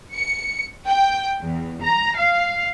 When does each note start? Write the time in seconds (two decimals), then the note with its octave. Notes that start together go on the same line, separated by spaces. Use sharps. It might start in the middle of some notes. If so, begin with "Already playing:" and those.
0.15 C#7
0.86 G5
1.42 E2
1.82 A#5
2.19 F5